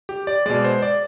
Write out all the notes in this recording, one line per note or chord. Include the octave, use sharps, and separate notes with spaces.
G4
D5
B2 G#3 D5
C5
D5